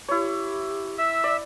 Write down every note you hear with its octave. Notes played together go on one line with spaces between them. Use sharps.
E4 G4 C#5
E5 E6
D5